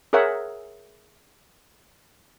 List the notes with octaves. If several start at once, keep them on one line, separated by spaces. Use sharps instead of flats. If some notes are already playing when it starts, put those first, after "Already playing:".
G#4 A#4 C#5 E5 F#5